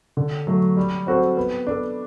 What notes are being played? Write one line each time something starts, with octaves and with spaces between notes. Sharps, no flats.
D3
F#3 A3
G3
C4 F#4 A4 C5
B3
D4 A4